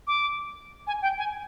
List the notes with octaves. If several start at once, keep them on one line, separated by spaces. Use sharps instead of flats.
D6
G#5
G5
G#5